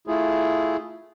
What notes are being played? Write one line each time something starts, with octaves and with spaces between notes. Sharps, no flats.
A3 E4 F4 G#4